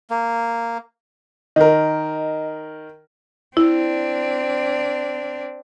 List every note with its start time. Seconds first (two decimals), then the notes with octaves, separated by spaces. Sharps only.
0.10 A#3
1.56 D#3 A#4 D#5
3.57 C4 D4 E4